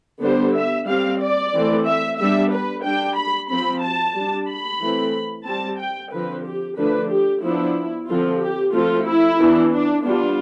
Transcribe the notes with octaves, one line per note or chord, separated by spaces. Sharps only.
D3 G3 B3 D4 C5
E5
G3 C4 F5
D5
E3 A3 C4
E5
G3 B3 D4 E5
B4
G3 D4 G5
B5
F3 C4 B5
A5
G3 D4
B5
E3 A3 C4
G3 C4 A5
G5
D3 F3 C4 B4
G4
D3 F3 A3 D4 B4
G4
F3 B3 D4 E4
D3 F3 C4 F4
G4
F3 A3 C4 F4
E4
E3 B3 D4
D4
G3 B3 D4 F4